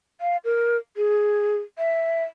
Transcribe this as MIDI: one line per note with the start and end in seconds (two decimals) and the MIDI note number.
0.21 0.37 77
0.45 0.77 70
0.97 1.57 68
1.78 2.24 76